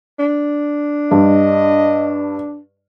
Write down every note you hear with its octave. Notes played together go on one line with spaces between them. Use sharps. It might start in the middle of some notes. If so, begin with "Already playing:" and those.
D4
G2 D#5